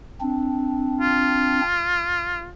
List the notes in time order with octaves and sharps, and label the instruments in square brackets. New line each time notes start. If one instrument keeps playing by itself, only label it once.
[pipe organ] C4 D4
[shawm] F4